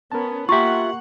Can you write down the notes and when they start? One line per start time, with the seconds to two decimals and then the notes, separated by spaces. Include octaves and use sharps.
0.12 B3 C#4 A#4 A5
0.49 A#3 F4 G4 E5 F#5 A#5 C6 C#6